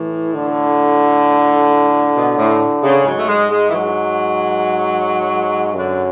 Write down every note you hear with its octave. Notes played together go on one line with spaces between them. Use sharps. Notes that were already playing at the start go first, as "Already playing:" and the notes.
Already playing: A2 E3
D3
B2
A2
C#3
G#2 F#3
A3
G#3
G#3
E3
F#3
F#2 D3